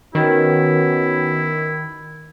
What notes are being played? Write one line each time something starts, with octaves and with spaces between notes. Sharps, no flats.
D#3 B3 C#4 E4 F#4